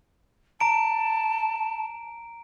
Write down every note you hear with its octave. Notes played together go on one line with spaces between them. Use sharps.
A5 A#5 D7